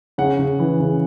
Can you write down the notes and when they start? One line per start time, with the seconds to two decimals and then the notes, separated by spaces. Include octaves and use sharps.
0.18 C#3 F#5
0.39 C#3
0.59 E3
0.80 C#3